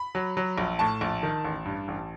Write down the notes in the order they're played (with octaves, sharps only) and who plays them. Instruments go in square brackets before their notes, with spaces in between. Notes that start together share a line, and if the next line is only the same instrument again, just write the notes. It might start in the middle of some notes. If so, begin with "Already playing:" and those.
Already playing: [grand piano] B5
F#3
F#3
A#1
A2 A5
A#1
D#3
A1
G2
A1